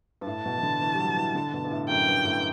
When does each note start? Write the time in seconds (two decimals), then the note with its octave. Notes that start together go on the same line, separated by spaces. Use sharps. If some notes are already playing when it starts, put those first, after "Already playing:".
0.21 G2
0.27 A2 A5
0.46 B2
0.58 E3
0.63 D3
0.81 E3
0.94 G3
0.99 F#3
1.17 E3
1.35 D3
1.53 B2
1.65 G2
1.71 A2
1.89 F#2 G5
2.07 G2
2.25 A2